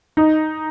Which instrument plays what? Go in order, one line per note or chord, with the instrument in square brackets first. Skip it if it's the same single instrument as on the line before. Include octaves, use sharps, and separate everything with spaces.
[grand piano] D#4